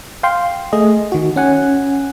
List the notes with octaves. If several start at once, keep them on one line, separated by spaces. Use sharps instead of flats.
F5 G5 C6
A3 G#4 D#5
D#3 F#4
C#4 F#5 G#5